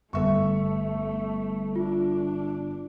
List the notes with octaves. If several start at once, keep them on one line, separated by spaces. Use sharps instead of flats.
G1 A3 A4 E5 C#6
D4 F4